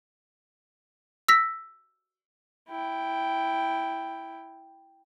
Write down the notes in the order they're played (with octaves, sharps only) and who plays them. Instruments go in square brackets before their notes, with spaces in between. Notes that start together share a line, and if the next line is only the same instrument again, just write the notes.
[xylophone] E6 A#6 B6
[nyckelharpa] E4 G5